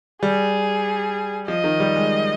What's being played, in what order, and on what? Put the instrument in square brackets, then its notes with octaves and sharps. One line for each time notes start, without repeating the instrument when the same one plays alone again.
[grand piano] G3 [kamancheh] G#4
[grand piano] F3 [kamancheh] D#5
[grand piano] D#3
G3
G#3